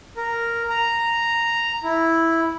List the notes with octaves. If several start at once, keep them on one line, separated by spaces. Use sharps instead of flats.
A#4
A#5
E4